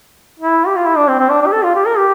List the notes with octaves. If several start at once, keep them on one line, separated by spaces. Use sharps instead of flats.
E4
G4
F4
E4
D4
C4
C4
D4
D4
G4
A4
F4
G4
A#4
G4